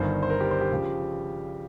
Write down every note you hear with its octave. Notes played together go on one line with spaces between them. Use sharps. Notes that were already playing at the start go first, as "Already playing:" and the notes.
Already playing: G1 G2 D#3 C5
C5
A#4
G4
C5
G4
C#3 F3